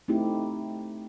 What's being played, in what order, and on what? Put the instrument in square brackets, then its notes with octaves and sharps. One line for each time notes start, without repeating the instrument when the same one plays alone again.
[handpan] A3 C4 D#4 E4 G4